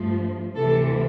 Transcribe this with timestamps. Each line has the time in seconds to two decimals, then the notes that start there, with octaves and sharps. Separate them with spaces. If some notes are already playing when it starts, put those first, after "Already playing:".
Already playing: G2 F3 A3
0.55 D2 C3 E3 A4